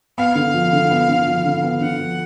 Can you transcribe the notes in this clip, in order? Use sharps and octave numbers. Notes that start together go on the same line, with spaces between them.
B3 F5
D3
F3
D3
B3
D3
F3
D3
B3
D3 F#5
F3